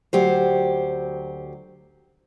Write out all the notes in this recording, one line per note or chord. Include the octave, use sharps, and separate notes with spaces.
D2 F#3 G4 C5